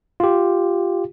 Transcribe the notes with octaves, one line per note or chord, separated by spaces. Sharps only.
F4 G4